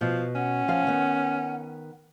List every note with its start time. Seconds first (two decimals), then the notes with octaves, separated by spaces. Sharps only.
0.01 B2 F3
0.35 C#4 F#5
0.68 F3 F5
0.87 D#3 B3